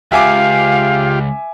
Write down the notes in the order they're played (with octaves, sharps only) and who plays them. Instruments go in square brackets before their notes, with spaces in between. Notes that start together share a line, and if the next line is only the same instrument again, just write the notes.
[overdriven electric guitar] C#2 [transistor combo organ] F4 G4 [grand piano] E5 G#5 D6 [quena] F5